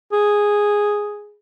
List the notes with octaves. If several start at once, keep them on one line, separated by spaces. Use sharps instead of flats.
G#4